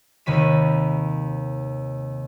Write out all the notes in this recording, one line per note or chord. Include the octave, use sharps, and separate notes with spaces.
D#2 C3 D#3 B5 D#7